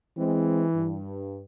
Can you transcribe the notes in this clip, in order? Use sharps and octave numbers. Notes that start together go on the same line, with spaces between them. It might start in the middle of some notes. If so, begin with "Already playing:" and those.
E3 G#3 C4
G2